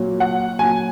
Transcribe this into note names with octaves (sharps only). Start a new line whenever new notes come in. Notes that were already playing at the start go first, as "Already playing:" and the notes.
Already playing: A#2 F#3
F#5
A#2 F#3 G#5